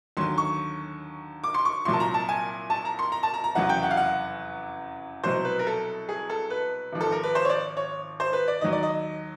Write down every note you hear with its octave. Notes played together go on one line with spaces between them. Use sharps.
D#2 D3 F#3 C6
C#6
D6
C6
C#6
C2 A#2 F#3 C6
A5
A#5
A5
G#5
A5
A#5
C6
A#5
A5
A#5
A#5
F1 E2 C#3 F#3 F#5
G5
F#5
F5
F#5
C2 B2 F#3 C5
B4
A#4
A4
G#4
A4
B4
G#1 G#2 F3
A4
A#4
B4
C5
C#5
D5
C#5
C5
B4
D5
D#2 D#3 F#3 D#5
D5
D#5